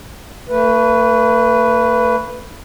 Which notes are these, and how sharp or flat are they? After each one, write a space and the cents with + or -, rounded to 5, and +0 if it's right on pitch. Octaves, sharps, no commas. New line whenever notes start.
A3 +40 B4 +0